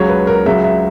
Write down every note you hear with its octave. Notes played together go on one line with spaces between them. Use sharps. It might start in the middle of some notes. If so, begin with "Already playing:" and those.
Already playing: C#2 C#3 F#3 C#5
B4
A#4
C#2 C#3 F#3 E5
E5